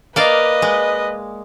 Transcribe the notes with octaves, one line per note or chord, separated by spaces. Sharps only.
A#3 B4 D5 D#5 F5
G#3